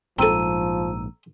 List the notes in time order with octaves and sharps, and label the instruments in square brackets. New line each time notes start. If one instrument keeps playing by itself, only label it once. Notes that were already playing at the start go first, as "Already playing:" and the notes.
[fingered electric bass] A#1 G#2 [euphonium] F3 [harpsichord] C4 A4 [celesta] A#5 E6 D#7